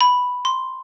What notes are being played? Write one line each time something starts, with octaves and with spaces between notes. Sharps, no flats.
B5
C6